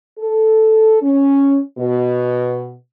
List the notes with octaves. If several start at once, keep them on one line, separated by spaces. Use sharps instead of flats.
A4
C#4
B2